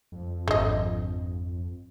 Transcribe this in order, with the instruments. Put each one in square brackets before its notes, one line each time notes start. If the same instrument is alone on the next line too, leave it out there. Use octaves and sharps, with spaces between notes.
[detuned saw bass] F2
[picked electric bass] G#1 [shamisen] D3 D#5